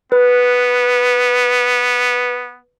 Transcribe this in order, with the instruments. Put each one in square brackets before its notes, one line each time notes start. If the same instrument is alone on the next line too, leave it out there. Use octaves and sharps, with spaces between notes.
[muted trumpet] B3 [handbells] B4